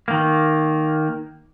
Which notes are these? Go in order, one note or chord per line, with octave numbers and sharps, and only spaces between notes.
D#3 A#3